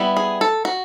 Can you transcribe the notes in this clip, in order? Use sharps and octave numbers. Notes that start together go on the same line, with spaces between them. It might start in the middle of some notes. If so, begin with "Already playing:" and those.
Already playing: G3 B3 E4
G#4
A4
F#4